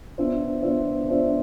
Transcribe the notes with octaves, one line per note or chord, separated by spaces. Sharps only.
B3 D4 F4 C5 E5
B3 D4 F4 C5 E5
B3 D4 F4 C5 E5